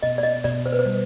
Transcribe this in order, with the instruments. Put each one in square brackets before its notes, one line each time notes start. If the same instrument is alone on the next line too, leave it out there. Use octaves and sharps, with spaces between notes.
[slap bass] B2 [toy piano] D#5
[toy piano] D5
D#5
[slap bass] B2 [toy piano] D5
[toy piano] C5
B4
C5
[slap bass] G3